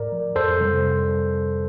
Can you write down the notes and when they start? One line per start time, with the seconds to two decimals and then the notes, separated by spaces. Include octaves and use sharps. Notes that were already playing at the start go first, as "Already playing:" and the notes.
Already playing: A2 A#4 D5
0.12 F3
0.36 F2 A4 C5
0.60 C3 G3